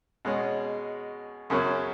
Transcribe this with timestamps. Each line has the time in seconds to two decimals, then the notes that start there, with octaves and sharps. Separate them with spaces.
0.25 B2 G#3 C#4
1.50 F#2 C#3 F#3 C#4